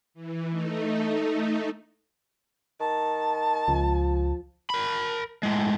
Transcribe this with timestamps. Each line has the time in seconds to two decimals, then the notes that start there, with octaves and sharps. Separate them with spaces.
0.14 E3
0.50 A3 D#4
2.80 D#3 A5
3.68 C#2 F3
4.70 A#4 B5
5.43 A2 G#3